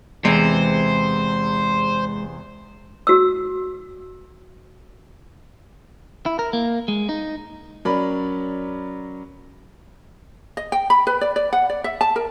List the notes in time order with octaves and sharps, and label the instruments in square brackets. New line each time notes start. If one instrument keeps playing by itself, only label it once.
[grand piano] E2 [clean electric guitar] C3 E3 [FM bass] G#3 [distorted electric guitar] C5
[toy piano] F#4 E6
[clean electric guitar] E4
A#4
A#3
G#3
D#4
[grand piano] F#3 C#4 A#4 D5 B5
[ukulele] D#5
G5
B5
B4
D5
D5
F#5
D5
E5
A5
A#4